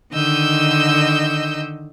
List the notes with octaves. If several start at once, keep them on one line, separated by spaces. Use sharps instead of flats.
D3 D#3 D#5 E6 G6